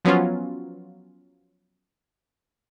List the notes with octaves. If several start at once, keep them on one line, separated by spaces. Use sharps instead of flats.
F3 F#3 B3 C#4 F4